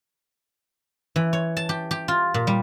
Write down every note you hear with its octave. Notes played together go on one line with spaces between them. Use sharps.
E3
C#5
A5
G4
G4
F4
A#2
G3